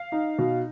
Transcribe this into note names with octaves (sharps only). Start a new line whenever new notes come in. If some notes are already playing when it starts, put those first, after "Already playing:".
Already playing: F5
D#4
B2